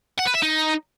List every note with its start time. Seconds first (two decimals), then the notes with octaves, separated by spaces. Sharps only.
0.19 F#5
0.27 B4
0.35 E5
0.43 D#4